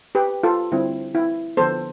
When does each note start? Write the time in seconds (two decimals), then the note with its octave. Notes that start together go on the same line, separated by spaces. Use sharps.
0.15 G4 B4
0.43 F4 A4
0.72 D3 G3 C4 E4
1.15 E4
1.57 D3 F3 B3 A4 C5